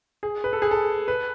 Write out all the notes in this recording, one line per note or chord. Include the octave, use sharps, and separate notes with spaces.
G#4
B4
A4
G#4
A4
B4